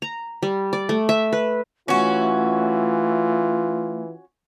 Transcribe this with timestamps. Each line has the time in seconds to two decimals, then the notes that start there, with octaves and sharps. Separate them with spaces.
0.02 A#5
0.43 G3
0.73 D5
0.89 A3
1.09 E5
1.33 B4
1.88 E3 A3 C#4 F4 F#4